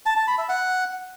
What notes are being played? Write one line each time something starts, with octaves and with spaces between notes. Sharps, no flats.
A5
A5
B5
E5
F#5